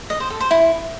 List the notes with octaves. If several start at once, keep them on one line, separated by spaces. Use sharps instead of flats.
D#5
C5
A4
C5
E4